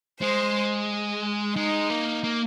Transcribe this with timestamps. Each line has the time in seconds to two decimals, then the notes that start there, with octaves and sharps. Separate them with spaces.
0.20 G#3 C5
1.56 G#3 D#4
1.90 A#3
2.24 A#3